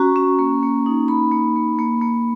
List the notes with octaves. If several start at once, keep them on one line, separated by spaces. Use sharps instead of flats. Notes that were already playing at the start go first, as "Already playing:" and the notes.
Already playing: C#4 F#4 A#5
C#4
A#3
A#3
D#4
A#3 B5
A#3
A#3
A#3
A#3